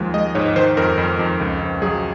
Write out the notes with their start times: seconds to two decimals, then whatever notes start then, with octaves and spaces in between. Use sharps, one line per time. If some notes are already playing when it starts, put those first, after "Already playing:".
Already playing: D#2 F3 G#3
0.14 G#3 D#5
0.35 G#2 C#5
0.56 D#3 C5
0.77 F2 A#4
0.98 F2
1.19 F2
1.40 C#2
1.61 C#2
1.82 F#3 G#4